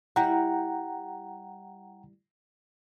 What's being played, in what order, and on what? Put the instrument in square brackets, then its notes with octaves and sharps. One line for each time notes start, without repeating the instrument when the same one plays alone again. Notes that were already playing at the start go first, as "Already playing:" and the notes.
[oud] G3 E4 [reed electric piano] F#5 G5 A#5